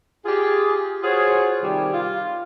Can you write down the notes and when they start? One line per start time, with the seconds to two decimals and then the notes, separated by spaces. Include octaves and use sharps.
0.26 F4 G4 G#4
1.03 F4 F#4 G#4 C5 C#5
1.62 C3 D#3 G3
1.93 F4